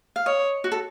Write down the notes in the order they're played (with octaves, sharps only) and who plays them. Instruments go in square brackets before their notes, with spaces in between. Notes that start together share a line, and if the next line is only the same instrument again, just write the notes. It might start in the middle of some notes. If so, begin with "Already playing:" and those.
[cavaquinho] F5
[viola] C#5 [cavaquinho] D#5
[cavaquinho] F#4
A4